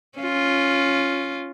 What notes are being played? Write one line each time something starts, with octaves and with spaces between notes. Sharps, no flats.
C#4 F4